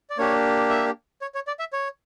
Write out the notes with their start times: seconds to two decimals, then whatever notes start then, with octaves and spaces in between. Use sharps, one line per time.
0.10 D5
0.18 A#3 D4 G4 C#5
0.70 E5
1.22 C#5
1.35 C#5
1.47 D5
1.59 E5
1.73 C#5